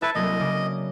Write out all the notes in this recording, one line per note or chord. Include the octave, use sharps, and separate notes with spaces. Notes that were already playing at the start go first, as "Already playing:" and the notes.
E4 A4 B4 E5 A5
C2 F#3 A#3 D#5
C#3 D6